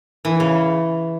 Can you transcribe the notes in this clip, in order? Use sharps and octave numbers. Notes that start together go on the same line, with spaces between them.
E3
C#3